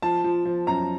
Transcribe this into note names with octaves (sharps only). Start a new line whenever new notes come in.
F3 A5
F3
F3
F#2 A#5